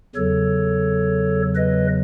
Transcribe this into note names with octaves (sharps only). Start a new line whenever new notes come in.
E2 C#3 F#3 A4 C#5
B4 D#5